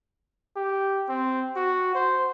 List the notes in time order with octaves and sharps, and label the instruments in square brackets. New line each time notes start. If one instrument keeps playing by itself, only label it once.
[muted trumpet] G4
C4
F#4
C5